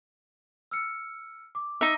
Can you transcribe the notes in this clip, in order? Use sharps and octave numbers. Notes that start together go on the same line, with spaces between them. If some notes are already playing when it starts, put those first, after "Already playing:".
E6 F6 C#7
D6
D#4 E5